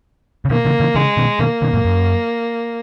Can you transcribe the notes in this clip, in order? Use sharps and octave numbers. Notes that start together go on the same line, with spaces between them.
C#3
B2 D#3 A#3
C#3 E3
C#3 E3
C#3 E3 G#3
B2 D#3
B2 D#3 A#3
B2 D#3
F#2 A#2
F#2